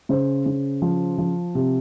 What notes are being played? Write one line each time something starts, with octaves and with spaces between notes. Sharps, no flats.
C#3 C5
C#3
F3
F3
C3